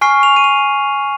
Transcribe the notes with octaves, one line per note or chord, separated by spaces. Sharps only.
G#5 C#6 F6 C7
F7
D#7
F7